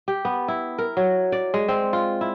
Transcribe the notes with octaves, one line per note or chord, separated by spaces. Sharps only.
G4
B3
E4
A#4
F#3
D5
G#3
C4
F4
E4